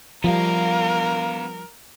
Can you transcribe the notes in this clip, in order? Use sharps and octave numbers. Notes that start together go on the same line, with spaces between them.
F3 G3 B3 A#4 F5